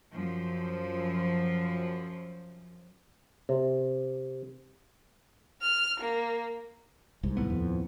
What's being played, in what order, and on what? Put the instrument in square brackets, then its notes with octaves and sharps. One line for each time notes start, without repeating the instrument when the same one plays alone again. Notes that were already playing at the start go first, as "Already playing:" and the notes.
[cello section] F#2 F3
[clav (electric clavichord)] C3
[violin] F6
A#3
[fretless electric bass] C2 G#2
[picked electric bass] D#2 A2 B3
[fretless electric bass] F2